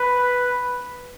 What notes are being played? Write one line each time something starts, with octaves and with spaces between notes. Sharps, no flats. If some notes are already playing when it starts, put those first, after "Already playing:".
Already playing: B4